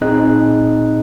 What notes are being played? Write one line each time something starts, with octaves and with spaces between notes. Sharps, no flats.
A#2 C4 D#4 G#4 D#5 F#6